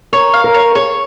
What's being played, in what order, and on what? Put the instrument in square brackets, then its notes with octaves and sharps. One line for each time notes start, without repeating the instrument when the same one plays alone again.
[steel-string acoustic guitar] A#4 [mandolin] C#5
[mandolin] F5
[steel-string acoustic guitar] A#4
[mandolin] C#5
[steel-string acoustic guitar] G#4 [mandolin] C#5